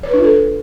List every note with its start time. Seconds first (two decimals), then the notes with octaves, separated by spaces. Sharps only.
0.03 C#5
0.08 B4
0.14 D4
0.19 F4
0.24 A4